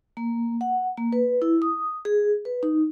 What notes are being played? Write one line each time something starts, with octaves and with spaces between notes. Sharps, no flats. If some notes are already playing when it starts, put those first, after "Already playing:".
A#3
F#5
A#3
B4
E4
D#6
G#4
B4
D#4